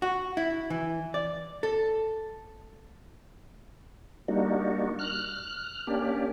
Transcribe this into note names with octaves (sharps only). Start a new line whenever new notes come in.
F#4
E4
E3
D5
A4
G3 A#3 D4 D#4 F#4
F6 F#6
A#3 C#4 D4 G4